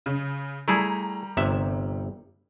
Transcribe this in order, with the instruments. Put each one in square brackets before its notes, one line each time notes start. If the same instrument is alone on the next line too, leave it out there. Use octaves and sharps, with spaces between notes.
[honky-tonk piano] C#3
[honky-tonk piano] G3 A#5 [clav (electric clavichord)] A3 E4 G#4
[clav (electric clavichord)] G1 C3 E5